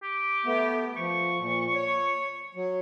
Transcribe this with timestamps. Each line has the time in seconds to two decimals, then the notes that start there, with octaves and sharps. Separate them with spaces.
0.03 G4
0.46 A3 B3
0.97 F3 C#6
1.39 A#2
1.74 C#5
2.55 F#3